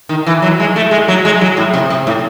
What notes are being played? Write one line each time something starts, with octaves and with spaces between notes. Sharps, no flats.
D#3
E3
F#3
G#3
A3
G#3
F#3
G#3
F#3
A2
C3
C3
A2